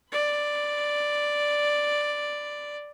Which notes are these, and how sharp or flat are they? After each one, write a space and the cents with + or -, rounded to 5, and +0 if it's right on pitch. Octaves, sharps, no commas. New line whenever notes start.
D5 +0 B5 +30